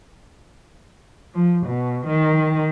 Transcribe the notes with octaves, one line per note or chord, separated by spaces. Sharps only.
F3
B2
D#3